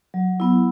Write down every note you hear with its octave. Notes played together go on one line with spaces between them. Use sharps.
F#3
B3 E4